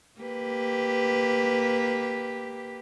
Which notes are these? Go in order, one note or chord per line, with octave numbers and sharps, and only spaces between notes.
A#3 G4 B4